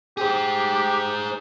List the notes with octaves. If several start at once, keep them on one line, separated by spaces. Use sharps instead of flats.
G4 G#4 C5